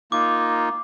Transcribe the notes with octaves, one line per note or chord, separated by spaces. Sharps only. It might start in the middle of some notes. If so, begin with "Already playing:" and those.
A#3 D#4 F4 D6